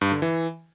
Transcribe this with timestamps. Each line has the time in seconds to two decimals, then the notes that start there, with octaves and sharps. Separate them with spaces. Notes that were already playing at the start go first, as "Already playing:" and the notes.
0.01 G2
0.12 D3
0.22 E3